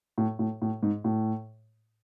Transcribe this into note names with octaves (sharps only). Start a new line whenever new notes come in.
A2
A2
A2
G#2
A2